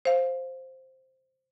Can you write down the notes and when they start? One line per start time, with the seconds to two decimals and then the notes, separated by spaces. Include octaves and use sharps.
0.05 C5 F5